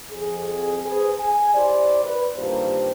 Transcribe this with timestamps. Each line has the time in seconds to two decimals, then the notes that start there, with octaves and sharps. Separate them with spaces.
0.11 F2 G#4
0.85 G#4 B4 C5
1.19 G#5
1.54 E4 G4 C5 D5
2.03 B4
2.36 G2 D#3 A#3 F4 G4 C5